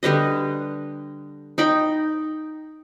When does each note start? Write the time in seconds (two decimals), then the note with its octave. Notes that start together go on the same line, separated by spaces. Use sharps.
0.03 D3 G3 B4 D#5
1.58 D#4 G5 B5